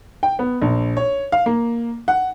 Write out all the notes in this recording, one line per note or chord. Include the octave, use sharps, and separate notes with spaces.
G5
B3
A#1
C#5
F5
A#3
F#5